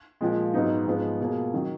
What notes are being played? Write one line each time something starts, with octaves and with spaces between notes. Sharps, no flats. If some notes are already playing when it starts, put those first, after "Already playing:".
A#2 F3 G#3
G#2 F#3 B3 D#4
G#2 F3 G#3 B3
B2 A#3 F4 G#4
D#3 F#3